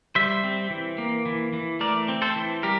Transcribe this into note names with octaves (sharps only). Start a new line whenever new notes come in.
G3 C5 E5
C4
E3
A#3
E3
E3
A3 A#4 D5
C4
A4 C5
E3
G3 G4 A#4